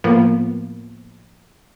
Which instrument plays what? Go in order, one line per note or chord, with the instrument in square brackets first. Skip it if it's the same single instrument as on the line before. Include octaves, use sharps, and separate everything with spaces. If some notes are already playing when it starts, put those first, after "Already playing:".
[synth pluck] A2 F3 A#3 B3